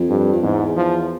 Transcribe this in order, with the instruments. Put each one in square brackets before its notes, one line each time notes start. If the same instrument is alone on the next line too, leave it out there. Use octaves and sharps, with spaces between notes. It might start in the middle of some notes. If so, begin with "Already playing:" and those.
Already playing: [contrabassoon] F2
[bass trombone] G2
[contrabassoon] F2
[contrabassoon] E2 [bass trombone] G#2
[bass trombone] F3